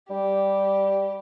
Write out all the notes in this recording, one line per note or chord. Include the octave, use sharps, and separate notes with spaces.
G3 G4